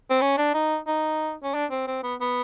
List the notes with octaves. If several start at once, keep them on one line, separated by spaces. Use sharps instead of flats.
C4
C#4
D4
D#4
D#4
C#4
D4
C4
C4
B3
B3